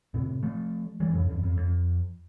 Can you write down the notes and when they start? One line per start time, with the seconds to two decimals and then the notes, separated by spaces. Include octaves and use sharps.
0.14 A2 C3
0.43 F3 A3
1.00 E3 G3
1.09 G2
1.14 F2 A2
1.29 E2 G2
1.43 F2
1.57 F2